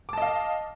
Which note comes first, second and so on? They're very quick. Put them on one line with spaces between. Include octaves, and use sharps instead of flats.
D6 A5 D#5 F5